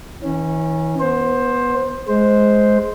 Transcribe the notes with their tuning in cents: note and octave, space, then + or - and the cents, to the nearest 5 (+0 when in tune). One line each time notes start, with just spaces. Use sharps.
E3 -45 C#4 -15
B3 -15 C5 +15
G#3 +15 C5 +0